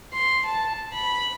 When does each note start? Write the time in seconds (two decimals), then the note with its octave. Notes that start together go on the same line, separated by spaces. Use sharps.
0.13 C6
0.45 A5
0.93 B5